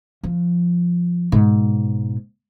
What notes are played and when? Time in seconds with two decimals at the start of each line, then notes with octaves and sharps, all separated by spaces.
0.23 F3
1.32 G#2 B2